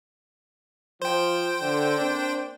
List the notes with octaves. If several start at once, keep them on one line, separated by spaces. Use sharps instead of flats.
F3 C5 G5
D3
A#3 C4 D4